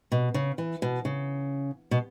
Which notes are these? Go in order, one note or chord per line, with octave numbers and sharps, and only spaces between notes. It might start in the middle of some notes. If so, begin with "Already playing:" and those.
B2
C#3
E3
B2
C#3
B2